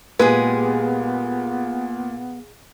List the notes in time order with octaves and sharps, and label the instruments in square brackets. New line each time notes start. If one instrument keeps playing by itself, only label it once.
[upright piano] A#2 [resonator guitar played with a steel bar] G#3 G4 G#4 [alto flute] B3 [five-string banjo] B4